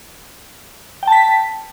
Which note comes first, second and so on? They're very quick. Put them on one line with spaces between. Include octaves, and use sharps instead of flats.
G5 A5 B6